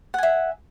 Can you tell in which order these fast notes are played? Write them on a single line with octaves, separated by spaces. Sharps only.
F#5 G#5 E5